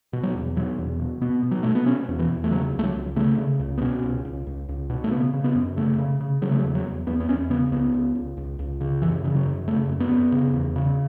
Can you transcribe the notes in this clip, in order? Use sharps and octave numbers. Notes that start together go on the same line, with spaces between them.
B2
F#3
E2
B2 F#3
E2
B2
B2 B3
B2
F#3
B2 A3
B3
B2 C#4
E2
E3
E2
A3
C#3 F#3
C#2
A3
F#3
C#2
C#3 A3
C#3
C#2
B3
B2 C#4
C#2
C#2
C#2
C#2
B2
A3
C#3 B3
C#3
B3
F#2
C#3 A3
C#3
C#3
C#3 F#3
A3
F#3
E2
F#3
E2
E2 B3
B3
E2 C#4
C#3 B3
C#2 B3
C#2
C#2
C#2
C#2
C#3
F#2 E3
C#3
F#3
F#2
C#3 A3
F#2
B3
F#2
C#3
E2
C#3